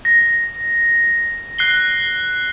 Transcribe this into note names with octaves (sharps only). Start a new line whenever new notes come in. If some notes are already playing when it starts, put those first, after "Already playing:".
A#6
F#6 C7 G7